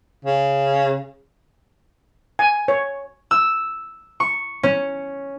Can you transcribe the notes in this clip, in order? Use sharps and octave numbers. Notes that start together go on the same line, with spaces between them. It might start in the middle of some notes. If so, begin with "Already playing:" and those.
C#3
G#5
C#5
E6
C#6
C#4